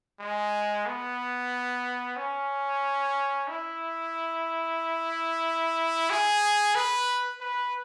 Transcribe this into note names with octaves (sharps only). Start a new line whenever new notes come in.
G#3
B3
C#4
E4
G#4
B4
B4